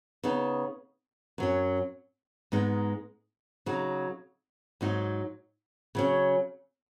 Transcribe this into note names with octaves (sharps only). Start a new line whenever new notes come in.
C#3 B3 D#4
F#2 F#3 C#4
G#2 G#3 B3 D#4
C#3 F#3 D#4
G#2 F#3 D#4
C#3 F#3 C#4